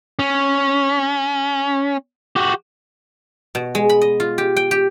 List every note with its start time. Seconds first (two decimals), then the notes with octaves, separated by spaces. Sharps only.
0.19 C#4
2.36 F#4 G4
3.55 B2
3.75 G#3
3.89 B5
4.01 D#5
4.20 F4
4.38 G4
4.56 G5
4.71 G4